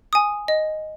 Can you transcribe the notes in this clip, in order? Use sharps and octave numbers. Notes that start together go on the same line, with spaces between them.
G#5 D#6
D#5